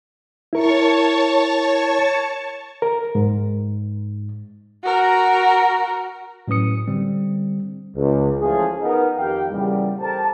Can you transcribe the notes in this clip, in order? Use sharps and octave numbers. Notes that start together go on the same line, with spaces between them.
E4 A#4 C#5 A5 C#6
A#4
G#2
F#4 A#4
A2 F#3 C#4 B4 D#6 C#7
D3 G3 C4
C#2
E3 F3 A3 C#4 F4 G#4
B3 D#4 A#4
F2 D#3 G4 F5 G5
E2 A#2 C#3 G3
G4 A4 A#4 C5 A5